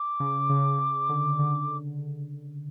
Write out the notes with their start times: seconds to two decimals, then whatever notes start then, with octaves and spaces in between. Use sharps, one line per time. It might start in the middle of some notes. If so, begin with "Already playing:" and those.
Already playing: D6
0.20 C#3
0.49 C#3
0.79 C#3
1.09 D3
1.39 D3